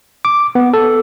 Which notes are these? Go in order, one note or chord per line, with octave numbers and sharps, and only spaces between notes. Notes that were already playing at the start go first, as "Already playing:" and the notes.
D6
B3
A4